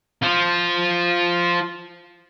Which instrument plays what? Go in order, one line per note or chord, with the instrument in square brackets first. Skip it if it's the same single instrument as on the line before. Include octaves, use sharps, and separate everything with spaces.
[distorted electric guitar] F4 C5